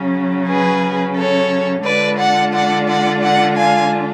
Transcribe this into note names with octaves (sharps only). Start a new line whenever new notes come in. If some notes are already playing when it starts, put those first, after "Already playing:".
Already playing: C#3 F#3 C#4
G#4 B4
A4 C#5
D3 G#3 D4 F4 B4 D5
D5 F#5
D5 F#5
D5 F#5
D5 F#5
F5 G#5